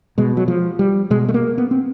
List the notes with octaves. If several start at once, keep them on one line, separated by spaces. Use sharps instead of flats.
B2 G#3
F#3
F3
G3
B2 G#3
A3
A#3
B3
C4